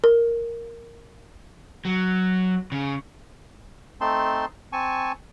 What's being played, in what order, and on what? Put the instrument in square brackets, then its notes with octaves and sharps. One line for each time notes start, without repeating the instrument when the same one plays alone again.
[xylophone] A#4
[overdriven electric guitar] F#3
C#3
[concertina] A3 C4 D#4 A5 C6
C4 G#5 A5 C#6